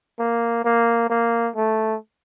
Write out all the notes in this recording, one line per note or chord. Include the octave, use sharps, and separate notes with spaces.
A#3
A#3
A#3
A3